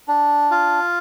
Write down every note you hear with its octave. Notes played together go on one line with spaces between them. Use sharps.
D4
F4